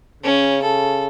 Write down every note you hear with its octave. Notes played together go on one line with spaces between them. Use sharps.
C#3 C#4
A4